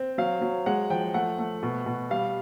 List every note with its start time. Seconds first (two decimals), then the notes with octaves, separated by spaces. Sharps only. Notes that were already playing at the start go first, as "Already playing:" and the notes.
Already playing: C4
0.18 F#3 F5
0.41 F#3
0.66 G#3 F#5
0.90 F3 G5
1.14 A3 F#5
1.39 A3
1.63 B2
1.86 B2
2.10 G3 F5